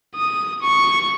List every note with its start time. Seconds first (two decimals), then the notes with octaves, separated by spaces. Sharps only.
0.15 D#6
0.62 C#6